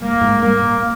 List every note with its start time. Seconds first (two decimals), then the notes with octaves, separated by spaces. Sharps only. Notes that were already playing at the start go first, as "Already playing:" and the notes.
0.01 G#2 A#3
0.12 A#2
0.21 G#2
0.41 G2 A#3
0.60 A#2
0.80 A#3